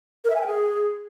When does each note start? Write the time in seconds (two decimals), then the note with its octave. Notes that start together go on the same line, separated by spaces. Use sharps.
0.24 A#4
0.30 E5
0.36 G#5
0.41 G5
0.47 G#4